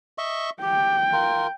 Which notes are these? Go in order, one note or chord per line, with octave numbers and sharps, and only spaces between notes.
D#5 E5 C#6
G4 G5
F4 A#4